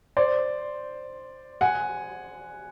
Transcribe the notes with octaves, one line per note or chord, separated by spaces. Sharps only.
C5 D5
F#5 G#5